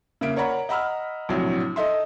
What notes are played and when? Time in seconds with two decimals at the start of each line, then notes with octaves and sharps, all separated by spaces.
0.21 C#3 A#3 E5 D7
0.36 A#4 C#5 D5 F#5 A#5 B5
0.69 D#5 F#5 A#5 B5 E6 F6
1.29 A#1 A2 C3 F#3
1.76 D#4 A4 D#5 E5 C6